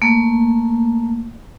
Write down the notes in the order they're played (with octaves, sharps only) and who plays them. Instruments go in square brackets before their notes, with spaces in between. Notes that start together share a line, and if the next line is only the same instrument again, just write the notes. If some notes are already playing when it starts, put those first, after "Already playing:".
[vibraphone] A3 A#3